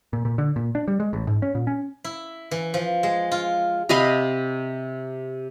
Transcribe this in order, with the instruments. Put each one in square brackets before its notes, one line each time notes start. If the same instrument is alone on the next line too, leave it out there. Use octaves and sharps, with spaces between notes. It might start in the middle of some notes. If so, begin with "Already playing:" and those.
[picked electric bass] A#2
A#2
D3
A#2
D4
G3
G#3
A1
G#2
C#4
A#2
C#4
[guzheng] E4
E3
F3
G#3
F4
[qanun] C3 D#5 F5 B5